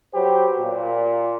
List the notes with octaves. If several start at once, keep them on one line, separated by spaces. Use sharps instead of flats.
F#3 G4 B4 C5
A#2